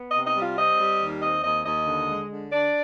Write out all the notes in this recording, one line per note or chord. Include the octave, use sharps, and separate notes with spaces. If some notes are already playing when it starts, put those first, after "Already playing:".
Already playing: B3
D#5
C3
D#5
G3
F4
C4 D#5
G3
D#2
C4 D#5
D#2 D#5
D#2 D#5
D3
G#3
D3
D4 D5